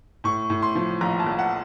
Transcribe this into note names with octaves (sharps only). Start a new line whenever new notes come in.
A2 C#6
A2
C6
F3
A#1 A#5
A5
A#1
F#5